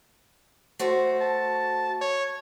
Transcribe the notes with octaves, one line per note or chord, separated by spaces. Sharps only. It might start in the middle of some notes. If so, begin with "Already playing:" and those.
A3 F#4 C5
A5
C#5